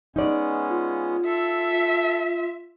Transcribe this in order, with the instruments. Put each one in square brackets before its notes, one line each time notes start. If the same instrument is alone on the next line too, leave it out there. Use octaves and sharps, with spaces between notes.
[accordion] G#3 B3 C#4 [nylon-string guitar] D#4 D5
[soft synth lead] F4
[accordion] A4 [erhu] E5